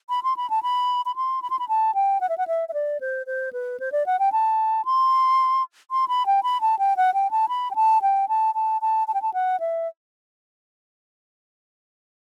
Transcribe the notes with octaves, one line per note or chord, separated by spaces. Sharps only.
B5
C6
B5
A5
B5
B5
C6
B5
C6
B5
A5
G5
F#5
E5
F#5
E5
E5
D5
C5
C5
B4
C5
D5
F#5
G5
A5
C6
C6
B5
G5
B5
A5
G5
F#5
G5
A5
B5
G5
A5
G5
A5
A5
A5
A5
G5
A5
F#5
E5